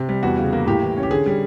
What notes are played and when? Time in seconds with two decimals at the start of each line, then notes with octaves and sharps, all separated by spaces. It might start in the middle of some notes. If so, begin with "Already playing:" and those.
Already playing: C3
0.09 G3
0.23 E2 F#4
0.38 C#3
0.53 A#3
0.67 A2 G4
0.82 E3
0.97 C#4
1.03 G4
1.10 D3 G#4
1.26 G3